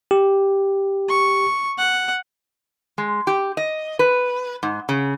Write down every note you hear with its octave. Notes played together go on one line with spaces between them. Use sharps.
G4
C#6
F#5
G#3
G4
D#5
B4
G#2
C#3